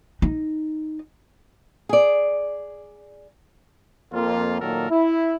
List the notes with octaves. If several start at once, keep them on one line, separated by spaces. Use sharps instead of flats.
D#4
G#4 D5
F2 A#3 F4
A#2 D#3 F#3 A#3 A4 A#4
E4